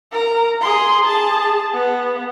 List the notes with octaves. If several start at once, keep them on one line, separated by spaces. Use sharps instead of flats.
A#4 A#5
G#4 C6
G#4 A5
B3